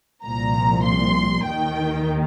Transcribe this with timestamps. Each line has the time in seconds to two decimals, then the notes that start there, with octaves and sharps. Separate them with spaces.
0.25 C2 A#2 F3 A#5
0.84 C6
1.45 D#2 D#3 G5